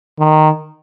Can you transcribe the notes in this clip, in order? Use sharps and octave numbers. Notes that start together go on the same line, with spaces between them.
D#3